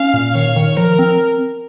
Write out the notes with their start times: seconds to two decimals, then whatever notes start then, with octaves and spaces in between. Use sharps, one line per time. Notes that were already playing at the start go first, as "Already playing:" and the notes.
Already playing: C#4 F5
0.14 A#2
0.34 D#3 C#5
0.56 D#3
0.77 F3 A#4
0.99 C4